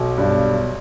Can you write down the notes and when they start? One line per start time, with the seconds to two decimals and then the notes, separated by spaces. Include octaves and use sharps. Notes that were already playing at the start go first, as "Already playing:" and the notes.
Already playing: B1 B2
0.18 G2